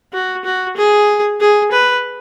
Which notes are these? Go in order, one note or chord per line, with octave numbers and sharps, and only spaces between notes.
F#4
F#4
G#4
G#4
B4